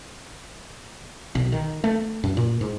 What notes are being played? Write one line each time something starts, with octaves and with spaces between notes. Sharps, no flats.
B1
D#3
A3
F#2
A#2
G#2